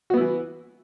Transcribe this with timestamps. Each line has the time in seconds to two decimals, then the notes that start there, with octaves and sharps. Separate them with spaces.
0.10 F#4
0.14 B3
0.17 E4
0.21 E3